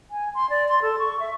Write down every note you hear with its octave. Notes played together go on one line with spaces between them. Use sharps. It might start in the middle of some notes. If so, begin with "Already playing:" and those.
G#5
C6
D5
C6
A4
C#6
E5